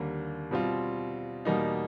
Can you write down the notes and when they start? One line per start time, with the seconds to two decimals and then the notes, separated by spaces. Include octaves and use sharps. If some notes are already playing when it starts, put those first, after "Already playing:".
Already playing: D#2 D3 G3 A#3
0.51 B2 G3 C4 F4
1.45 E2 B2 G3 A#3 D#4